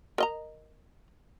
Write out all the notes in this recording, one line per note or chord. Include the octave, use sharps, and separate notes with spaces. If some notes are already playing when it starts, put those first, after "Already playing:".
A#4 D#5 A#5